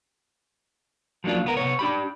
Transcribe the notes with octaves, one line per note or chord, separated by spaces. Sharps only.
F3 F#3 A#3 D4 F4
C#2 B3 A#4
C3 B3 C#5
D4 G4 B5